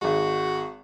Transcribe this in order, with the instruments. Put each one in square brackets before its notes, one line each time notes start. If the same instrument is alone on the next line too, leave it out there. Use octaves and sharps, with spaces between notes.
[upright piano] G#1 G#3 [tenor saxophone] F#4